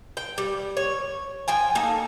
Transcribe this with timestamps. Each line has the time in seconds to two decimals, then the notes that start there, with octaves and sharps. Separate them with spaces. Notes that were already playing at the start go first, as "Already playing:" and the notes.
0.17 G5
0.38 G3
0.77 C#5
1.48 F3 G5 G#5
1.75 A#3 D#4 A4